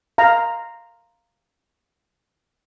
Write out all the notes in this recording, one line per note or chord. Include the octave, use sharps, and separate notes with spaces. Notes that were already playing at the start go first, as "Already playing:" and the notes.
F5 A#5